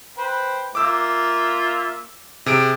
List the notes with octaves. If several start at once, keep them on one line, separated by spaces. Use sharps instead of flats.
B4 C5 G5
A#3 F4 E5 D6 E6
C3 G#4 D7